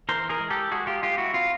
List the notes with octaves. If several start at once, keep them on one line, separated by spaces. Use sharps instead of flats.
E3 A#4 C5
G#4 A#4
G#3
G4 A4
G#3 F#4 G#4
F4 G4
G#3 F4 G4
E4 F#4
C4 F4